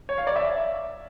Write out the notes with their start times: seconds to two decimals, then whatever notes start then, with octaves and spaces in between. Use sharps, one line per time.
0.09 C#5
0.18 F5
0.27 D5
0.36 E5